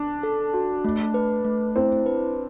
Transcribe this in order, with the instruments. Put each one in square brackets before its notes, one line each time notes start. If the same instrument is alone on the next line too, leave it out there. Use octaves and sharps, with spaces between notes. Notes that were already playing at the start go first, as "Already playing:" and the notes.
Already playing: [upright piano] D4
[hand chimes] A4
F#4
A3
B4
A3
[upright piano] C4 [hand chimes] E4
[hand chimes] B4